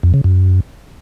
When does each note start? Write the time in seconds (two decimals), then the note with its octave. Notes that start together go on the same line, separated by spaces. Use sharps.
0.03 F2
0.14 C#3
0.24 F#2